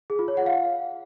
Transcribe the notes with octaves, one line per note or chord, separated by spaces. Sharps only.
G#4
F4
C#5
F#5
F5